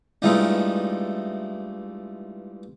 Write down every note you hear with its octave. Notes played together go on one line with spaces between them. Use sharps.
G2 E3 F3 G#3 A3 D#4